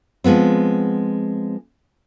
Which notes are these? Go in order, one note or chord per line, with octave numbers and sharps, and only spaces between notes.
F3 G#3 B3 C4